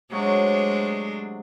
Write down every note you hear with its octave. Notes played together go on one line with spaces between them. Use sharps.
C3 F#3 G#3 A3 D4 F#4